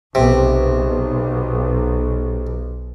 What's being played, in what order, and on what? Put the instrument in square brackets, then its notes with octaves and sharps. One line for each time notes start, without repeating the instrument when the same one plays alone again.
[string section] B1 [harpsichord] C3